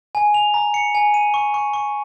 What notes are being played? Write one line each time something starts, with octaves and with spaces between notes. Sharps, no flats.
G#5
F7
A#5
C#7
G#5
D#7
C#6
C#6
C#6